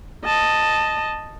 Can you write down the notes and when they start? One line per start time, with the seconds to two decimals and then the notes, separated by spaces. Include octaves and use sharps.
0.25 D#5 A5